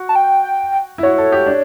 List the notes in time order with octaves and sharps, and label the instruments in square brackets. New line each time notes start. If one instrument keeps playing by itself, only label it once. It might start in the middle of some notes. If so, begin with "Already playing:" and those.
Already playing: [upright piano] F#4
[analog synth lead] A5
G5
[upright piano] E4
[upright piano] F#4 [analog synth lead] C#5
[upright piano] A4
G4
D4